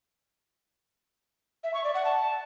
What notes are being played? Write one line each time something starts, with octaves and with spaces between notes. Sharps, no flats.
E5
C#6
D5
F#5
A5